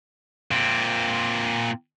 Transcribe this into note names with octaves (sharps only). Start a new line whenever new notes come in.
A#2 C4